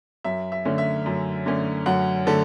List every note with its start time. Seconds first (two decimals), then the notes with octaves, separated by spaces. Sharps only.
0.24 F#2 E5
0.52 E5
0.65 D3 A3 C#4
0.78 E5
1.06 F#2
1.46 D3 A3 C#4
1.86 F#2 F#5
2.27 D3 A3 A4